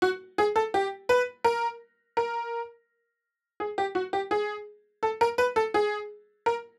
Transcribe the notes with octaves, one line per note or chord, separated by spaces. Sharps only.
F#4
G#4
A4
G4
B4
A#4
A#4
G#4
G4
F#4
G4
G#4
A4
A#4
B4
A4
G#4
A#4